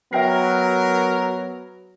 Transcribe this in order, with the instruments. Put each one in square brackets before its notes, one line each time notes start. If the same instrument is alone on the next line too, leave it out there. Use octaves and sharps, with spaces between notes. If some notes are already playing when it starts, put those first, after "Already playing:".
[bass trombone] F#3 [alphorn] B3 [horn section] A#4 [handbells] E5 G5 C7